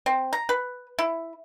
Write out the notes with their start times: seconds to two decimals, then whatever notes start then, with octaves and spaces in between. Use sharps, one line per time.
0.06 C4
0.33 A#5
0.49 B4
0.99 E4